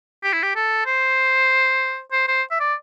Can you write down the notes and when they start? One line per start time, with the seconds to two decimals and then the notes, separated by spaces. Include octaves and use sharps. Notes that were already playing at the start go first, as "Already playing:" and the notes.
0.24 G4
0.33 E4
0.43 G4
0.56 A4
0.86 C5
2.12 C5
2.28 C5
2.51 E5
2.60 D5